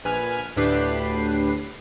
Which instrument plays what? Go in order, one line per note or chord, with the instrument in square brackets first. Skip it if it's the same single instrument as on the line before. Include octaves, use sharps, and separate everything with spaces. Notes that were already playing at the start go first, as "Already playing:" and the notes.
[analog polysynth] A#1 B4 G#5 F6
D2 A2 D4 G4 B4 C7